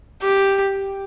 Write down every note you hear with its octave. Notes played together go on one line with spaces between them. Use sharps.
G4